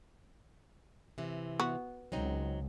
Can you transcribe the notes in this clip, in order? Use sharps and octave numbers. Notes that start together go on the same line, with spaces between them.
C3 E3
B3 F#4
C#2 F#3 C4 D#4